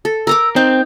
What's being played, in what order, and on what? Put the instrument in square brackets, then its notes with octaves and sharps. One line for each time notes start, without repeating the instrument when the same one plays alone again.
[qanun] A4
[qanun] A#4 A#5 D6 [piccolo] E6
[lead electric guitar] C4 [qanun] D#4 [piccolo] G6